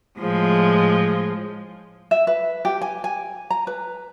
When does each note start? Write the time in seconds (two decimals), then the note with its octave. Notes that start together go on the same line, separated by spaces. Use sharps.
0.19 A2 F3 G#3
2.11 E5
2.27 B4
2.65 G4
2.81 G#5
3.04 G#5
3.50 A#5
3.67 B4